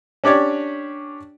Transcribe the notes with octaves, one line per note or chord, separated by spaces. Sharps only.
C#4 D4 G4 C#5 D5